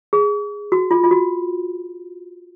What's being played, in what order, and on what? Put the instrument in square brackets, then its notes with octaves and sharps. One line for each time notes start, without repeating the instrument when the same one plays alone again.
[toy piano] G#4
F#4
F4
F4
F#4